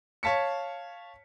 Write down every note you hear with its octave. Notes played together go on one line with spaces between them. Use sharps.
C#5 F5 A5 B6 C#7